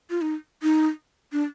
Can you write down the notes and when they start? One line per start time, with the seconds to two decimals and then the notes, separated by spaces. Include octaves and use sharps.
0.10 F4
0.22 D#4
0.63 D#4
1.32 D4